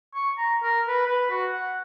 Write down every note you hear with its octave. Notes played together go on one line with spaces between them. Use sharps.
C#6
A#5
A#4
B4
B4
F#4
F#5